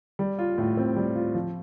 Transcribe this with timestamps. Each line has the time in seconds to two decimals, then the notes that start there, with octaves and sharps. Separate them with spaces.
0.19 G3
0.39 F4
0.58 A2
0.77 C4
0.96 G3
1.16 F4
1.35 F3